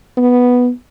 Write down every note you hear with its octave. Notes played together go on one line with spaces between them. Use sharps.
B3